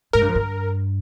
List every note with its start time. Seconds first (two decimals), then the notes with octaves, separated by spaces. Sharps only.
0.13 G#2 A#4
0.21 G2
0.28 F2
0.35 G2